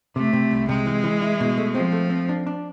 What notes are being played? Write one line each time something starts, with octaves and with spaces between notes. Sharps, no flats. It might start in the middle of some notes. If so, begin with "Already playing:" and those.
C3 A3
C3
C2
C3 G#3
E3
E3
E4
B2
A3
F3 C4
A3
C4
D4
D4